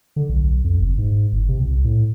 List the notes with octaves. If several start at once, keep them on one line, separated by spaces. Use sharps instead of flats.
D3
B1
B1
F2
F#1
G#2
G1
C3
C2
A2